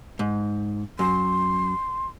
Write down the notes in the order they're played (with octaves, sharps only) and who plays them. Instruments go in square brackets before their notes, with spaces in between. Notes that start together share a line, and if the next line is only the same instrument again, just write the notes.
[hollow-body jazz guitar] G#2
[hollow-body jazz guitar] F#2 [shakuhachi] C6